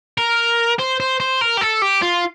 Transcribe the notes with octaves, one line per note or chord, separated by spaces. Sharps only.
A#4
C5
C5
C5
A#4
G4
A4
G4
F4